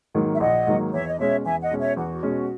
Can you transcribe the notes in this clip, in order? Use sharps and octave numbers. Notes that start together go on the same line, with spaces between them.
G#2 D#3 F#3 A#3
E5
A#1 D#5 F#5
G#2 D#3 F#3 A#3
E2 C#5 E5
D#5
B2 G#3 C#4 C#5 E5
E2 E5 G#5
D#5 F#5
B2 G#3 C#4
C#5 E5
E2 F#4
B2 G#3 C#4